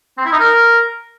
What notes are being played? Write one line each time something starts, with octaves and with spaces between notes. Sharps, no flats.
C4
E4
D#4
A#4